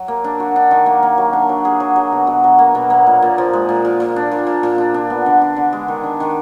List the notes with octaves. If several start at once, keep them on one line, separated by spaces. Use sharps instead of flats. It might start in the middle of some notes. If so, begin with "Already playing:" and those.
Already playing: F#3
A#3
D4
F#4
D4
D#3
A#3
A#3
F#3
D4
F#3
G#4
F#3
F#3
B2
B2
F#3
A#3
B2
A#3
A#2
A#2
F3
G#3
A#2
A#2
A#2
D4
A#2
A#2
A#2
D4
D4
B3
D3
D4
D3
G#3
D#3
D4
D#3